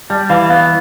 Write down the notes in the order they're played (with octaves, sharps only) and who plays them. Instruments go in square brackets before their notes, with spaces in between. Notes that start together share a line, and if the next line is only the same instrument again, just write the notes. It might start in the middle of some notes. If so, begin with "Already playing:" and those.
[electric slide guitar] G3 [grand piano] A5
[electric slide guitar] E3 [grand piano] F5
[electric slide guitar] B3 [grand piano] F5